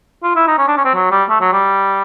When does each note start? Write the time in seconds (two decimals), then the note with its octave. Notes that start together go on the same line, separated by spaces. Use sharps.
0.23 F4
0.36 E4
0.47 D#4
0.58 C#4
0.67 D4
0.77 C#4
0.85 C4
0.94 F#3
1.11 G3
1.29 A3
1.41 F#3
1.53 G3